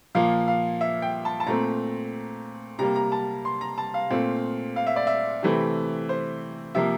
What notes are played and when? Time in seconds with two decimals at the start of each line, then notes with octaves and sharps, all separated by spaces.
0.15 A#2 F3 A#3 F5
0.48 F5
0.81 E5
1.02 G5
1.25 A5
1.40 A5
1.47 A#2 A3 C4 A#5
2.79 C3 G3 A#3 A#5
2.96 A#5
3.12 A5
3.45 C6
3.61 A#5
3.78 A5
3.94 F5
4.10 A#2 A3 C4
4.76 F5
4.87 E5
4.96 D5
5.07 E5
5.43 C3 E3 A3 C4
6.09 C5
6.75 C3 F3 A#3 E5